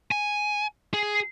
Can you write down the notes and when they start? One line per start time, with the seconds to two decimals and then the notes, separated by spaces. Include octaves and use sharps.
0.11 G#5
0.94 G#4